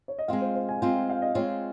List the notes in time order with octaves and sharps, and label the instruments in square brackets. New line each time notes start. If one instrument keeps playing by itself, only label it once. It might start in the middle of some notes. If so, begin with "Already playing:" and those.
[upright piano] C#5
D#5
[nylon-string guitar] G#3 C4 F4 [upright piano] F5
[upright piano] C5
C5
G#5
[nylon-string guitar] G#3 C4 F4 [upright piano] G5
[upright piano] F5
D#5
[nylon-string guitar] G#3 C4 F4 [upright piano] C#5